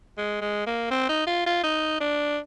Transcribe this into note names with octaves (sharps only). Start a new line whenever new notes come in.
G#3
G#3
A#3
C4
D#4
F4
F4
D#4
D4